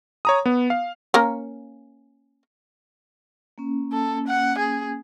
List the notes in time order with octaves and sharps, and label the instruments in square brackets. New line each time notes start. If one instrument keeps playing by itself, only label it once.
[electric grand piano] C#5 A#5 D#6
B3
F5
[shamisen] A#3 C#4 A#4
[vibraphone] A#3 C#4
[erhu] A4
F#5
G#4